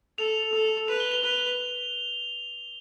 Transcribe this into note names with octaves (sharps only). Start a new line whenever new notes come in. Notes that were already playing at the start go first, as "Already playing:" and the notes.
A4 F7
A4
B4 F7
G7
F7
B4